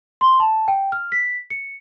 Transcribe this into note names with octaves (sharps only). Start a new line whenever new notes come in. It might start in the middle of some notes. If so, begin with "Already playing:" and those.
C6
A5
G5
F6
B6
C#7